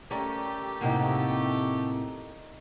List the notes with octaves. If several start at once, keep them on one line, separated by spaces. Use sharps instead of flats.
A3 C#4 G4 A#4 D5
A2 C3 A#3 D#4 D#5 F#5